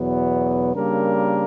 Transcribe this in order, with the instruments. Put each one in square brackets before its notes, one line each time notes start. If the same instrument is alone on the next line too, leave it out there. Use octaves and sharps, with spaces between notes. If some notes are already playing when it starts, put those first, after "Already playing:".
Already playing: [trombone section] E2 B2 F#3 B3
C#3 G3 A#3 D4 A#4